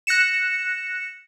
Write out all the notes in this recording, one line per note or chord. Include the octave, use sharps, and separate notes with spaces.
F#6 A#6 C#7 E7